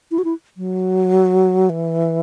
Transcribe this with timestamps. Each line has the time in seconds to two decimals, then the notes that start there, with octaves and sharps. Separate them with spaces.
0.11 E4
0.18 F#4
0.25 E4
0.57 F#3
1.70 E3